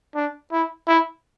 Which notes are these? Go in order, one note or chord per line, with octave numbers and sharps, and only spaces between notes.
D4
E4
E4